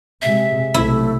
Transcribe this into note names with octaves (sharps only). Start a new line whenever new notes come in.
C3 G#3 E5
B1 C3 A3 E4